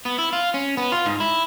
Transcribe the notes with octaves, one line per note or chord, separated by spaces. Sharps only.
B3
E4
F4
C#4
B3
F4
G#2
E4